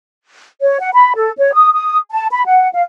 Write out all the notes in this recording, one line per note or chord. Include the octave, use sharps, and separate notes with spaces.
C#5
F#5
B5
A4
C#5
D#6
D#6
A5
B5
F#5
F5